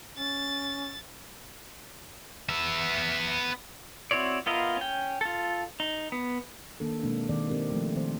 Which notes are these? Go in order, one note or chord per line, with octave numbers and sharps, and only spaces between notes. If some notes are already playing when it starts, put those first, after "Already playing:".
C#4 A6
B3 E5
C4 E4 F#4 C#5 D5
B3 E4 F4 A#4 D#5
C#4 G5
F4 A4
D#4
B3
D#3 A#3 D4 A4
B2 G#3 A#3 C4 D4
D#3 C4 D5
C4 G4 A#4
F3 A3
D#3 C4 C5